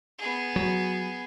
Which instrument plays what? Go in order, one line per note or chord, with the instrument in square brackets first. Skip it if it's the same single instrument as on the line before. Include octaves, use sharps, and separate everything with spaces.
[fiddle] B3 G#4
[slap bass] F#3